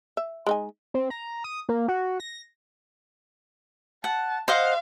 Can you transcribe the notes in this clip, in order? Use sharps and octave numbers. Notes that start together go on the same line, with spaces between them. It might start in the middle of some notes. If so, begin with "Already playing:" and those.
E5
G#3 D#4 G#5
C4
A#5
D#6
A#3
F#4
A#6
F#5 A5
C5 D#5 F5 F#5